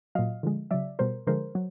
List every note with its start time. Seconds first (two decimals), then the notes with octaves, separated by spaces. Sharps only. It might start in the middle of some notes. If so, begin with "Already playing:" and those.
0.15 A#2 F#3 D#5 F5
0.43 D3 F3 G#3
0.71 C#3 F#3 D5 E5
0.99 B2 G3 A#4 C5
1.27 D3 F3 G#3 A#4 C5
1.55 F#3